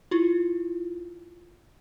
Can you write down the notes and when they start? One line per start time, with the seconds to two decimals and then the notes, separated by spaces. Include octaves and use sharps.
0.11 E4 F4